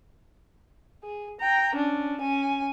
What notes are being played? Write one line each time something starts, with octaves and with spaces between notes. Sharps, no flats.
G#4
G5 A#5
C#4 D4
C#4 G#5